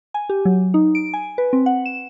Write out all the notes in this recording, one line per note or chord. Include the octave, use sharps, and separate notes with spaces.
G#5
G4
F#3
D#4
D7
G#5
B4
C4
F#5
E7